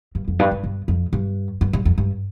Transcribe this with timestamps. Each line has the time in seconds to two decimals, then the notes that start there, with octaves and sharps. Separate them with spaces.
0.15 G2
0.28 F2
0.39 G2
0.51 G2
0.64 G2
0.88 F2
1.13 G2
1.61 G2
1.73 G2
1.85 F2
1.98 G2